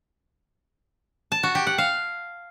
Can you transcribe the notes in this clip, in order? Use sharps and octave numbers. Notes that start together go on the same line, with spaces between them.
A5
F#4
G4
F#5
F5